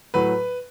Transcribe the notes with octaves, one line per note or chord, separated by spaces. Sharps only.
A2 F#3 B4